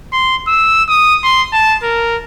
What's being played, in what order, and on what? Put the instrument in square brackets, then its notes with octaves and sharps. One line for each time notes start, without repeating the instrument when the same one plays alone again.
[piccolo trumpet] C6
E6
D#6
C6
A5
A#4